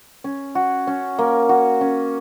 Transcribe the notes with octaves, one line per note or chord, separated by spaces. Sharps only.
C#4
F#4
C#4
A#3
F#4
C#4